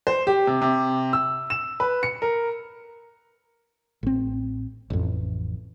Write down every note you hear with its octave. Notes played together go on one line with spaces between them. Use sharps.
C5
G4
C3
C3
E6
E7
B4
C#7
A#4
A1 C4
A1 F2